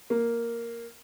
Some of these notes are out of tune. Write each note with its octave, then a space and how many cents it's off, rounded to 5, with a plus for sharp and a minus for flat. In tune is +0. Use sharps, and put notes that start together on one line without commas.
A#3 +0